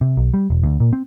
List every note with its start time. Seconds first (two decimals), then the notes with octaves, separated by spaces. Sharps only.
0.01 C3
0.17 B1
0.34 G3
0.50 E1
0.63 D2
0.80 A#2
0.93 C4